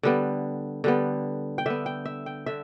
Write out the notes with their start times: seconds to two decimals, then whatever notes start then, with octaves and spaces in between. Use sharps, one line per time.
0.03 D3 G3 B3
0.84 D3 G3 B3
1.58 G5
1.66 D3 B3 E5
1.86 G5
2.05 E5
2.26 G5
2.46 D3 E5